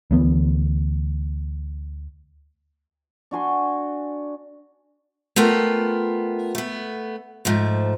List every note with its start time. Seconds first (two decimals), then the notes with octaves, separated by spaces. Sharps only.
0.11 D2 E3 B3
3.31 D4 F#4 G#5 C6
5.36 A3 B3 F4 A#4 G5
6.55 A3 B3
7.45 G#2 F3 A3